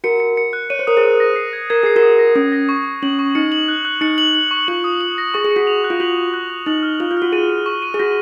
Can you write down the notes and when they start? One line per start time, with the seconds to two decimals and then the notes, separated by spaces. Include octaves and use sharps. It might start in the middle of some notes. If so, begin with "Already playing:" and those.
0.04 F#4 A#4 C#7
0.20 C#7
0.37 C#7
0.53 F#6
0.70 C#5 D#7
0.79 C5
0.87 A#4 D#6
0.97 G#4 C5
1.04 D#7
1.20 A#6
1.36 C7
1.53 G#6
1.70 A#4 G#6
1.83 G#4 C7
1.96 F#4 A#4
2.03 D#6
2.19 A#6
2.36 C#4 D#6
2.52 A#6
2.69 C#6
2.85 C#6
3.03 C#4 F#7
3.19 C#6
3.35 D#4 C#7
3.52 F#7
3.68 F#6
3.85 F#6
4.01 D#4 C#7
4.18 F#7
4.35 F#7
4.51 C#6
4.68 F4 F#7
4.84 D#6
5.01 F#7
5.18 A#6
5.34 G#4 C#6
5.45 G#4
5.51 C#7
5.56 F#4
5.67 F7
5.84 F#6
5.90 F4
6.00 F#4 F#7
6.16 F#7
6.34 F#6
6.50 F#6
6.66 D#4 F#7
6.83 F6
7.00 F4 F#7
7.11 F4
7.17 F#4 F6
7.32 G#4 D#7
7.49 D#7
7.66 C#6
7.82 D#7
7.94 G#4
7.99 F#4 A#6